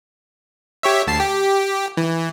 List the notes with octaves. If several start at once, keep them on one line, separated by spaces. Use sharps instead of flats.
G4 C#5 E5
D2 A5 C7
G4
E3